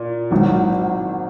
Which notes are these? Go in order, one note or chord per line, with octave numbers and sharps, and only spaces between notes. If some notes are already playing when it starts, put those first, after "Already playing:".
Already playing: A#2
G#1 G#2 D#3 F#3